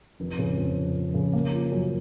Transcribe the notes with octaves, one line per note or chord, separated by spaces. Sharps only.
F1
C#3
F2
F1
F1
C#3
A#3
F3
F#2